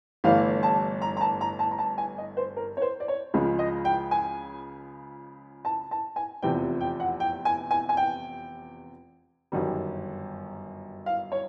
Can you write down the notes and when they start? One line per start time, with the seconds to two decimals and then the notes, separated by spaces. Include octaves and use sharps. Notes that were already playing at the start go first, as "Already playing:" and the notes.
0.24 G1 G2 E3 A3 F5
0.63 A5
1.02 A#5
1.17 A#5
1.21 A5
1.41 A#5
1.59 A5
1.71 A#5
1.79 A5
1.98 G#5
2.18 D#5
2.37 C5
2.57 A#4
2.77 C#5
2.82 C5
3.00 D5
3.08 C#5
3.34 C#2 C#3 F3 G#3
3.59 D#5
3.85 G5
4.11 G#5
5.65 A5
5.91 A5
6.16 G#5
6.42 F1 E2 C3 F3 G5
6.81 G5
7.00 F#5
7.20 G5
7.45 G#5
7.71 G#5
7.89 G#5
7.97 G5
9.52 G1 F#2 D#3 G3
11.06 F5
11.32 C#5